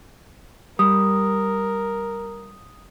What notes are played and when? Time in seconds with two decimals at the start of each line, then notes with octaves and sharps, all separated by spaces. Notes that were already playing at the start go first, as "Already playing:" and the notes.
0.79 G3 A#4 D#6